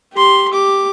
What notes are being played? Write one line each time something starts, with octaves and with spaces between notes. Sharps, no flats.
G4 C6
G4 D6